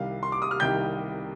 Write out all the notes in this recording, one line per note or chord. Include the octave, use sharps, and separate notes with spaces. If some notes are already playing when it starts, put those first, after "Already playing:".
Already playing: C2 C3 D#3 G3 F5
C6
D6
D#6
F6
C2 C3 D#3 G3 G5 G6